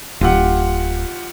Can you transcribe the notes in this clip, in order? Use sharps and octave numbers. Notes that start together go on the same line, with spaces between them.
D1 F4 G4 F#5